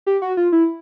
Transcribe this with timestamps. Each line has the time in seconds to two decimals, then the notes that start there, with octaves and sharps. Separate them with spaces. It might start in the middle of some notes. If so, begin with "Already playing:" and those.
0.07 G4
0.22 F#4
0.37 F4
0.52 E4